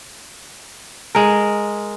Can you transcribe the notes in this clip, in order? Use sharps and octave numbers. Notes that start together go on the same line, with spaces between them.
G#3 A#4